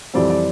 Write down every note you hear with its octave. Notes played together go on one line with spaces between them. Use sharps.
F2 E3 G3 C4 D5
D5